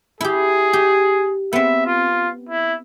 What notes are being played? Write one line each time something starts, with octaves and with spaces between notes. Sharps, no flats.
E4 G4 G#4
G4
B3 C4 E5
F4
E4